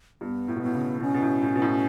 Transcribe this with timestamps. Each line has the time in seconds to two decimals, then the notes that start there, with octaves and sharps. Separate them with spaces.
0.21 G2 B3
0.48 A2
0.56 B2
0.62 A2 B3
0.74 C#3
1.01 B2 C#4
1.14 B2
1.22 A2
1.42 A2
1.55 B2
1.62 A2